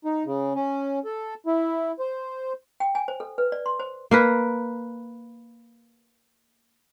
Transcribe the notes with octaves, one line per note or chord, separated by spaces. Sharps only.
D#4
C#3
C#4
A4
E4
C5
G5
G#5
C5
A4
B4
D5
C6
C5
A#3 A#4 B4